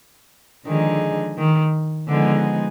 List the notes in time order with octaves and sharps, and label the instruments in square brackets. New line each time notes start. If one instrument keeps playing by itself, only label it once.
[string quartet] D3 F3 G#3 D#4 G#4 [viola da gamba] D#3
[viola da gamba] D#3
[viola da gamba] D3 [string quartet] F3 G#3 B3 D#4 G#4